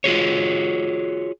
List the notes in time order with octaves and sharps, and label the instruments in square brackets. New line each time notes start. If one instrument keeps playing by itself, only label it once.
[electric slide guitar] F4 F#4 G#4 C#5